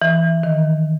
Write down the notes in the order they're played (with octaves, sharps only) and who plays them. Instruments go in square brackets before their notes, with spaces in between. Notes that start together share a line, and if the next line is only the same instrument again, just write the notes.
[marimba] E3
D#3